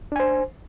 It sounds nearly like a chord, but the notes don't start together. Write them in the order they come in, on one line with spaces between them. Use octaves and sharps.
D4 G#5 C5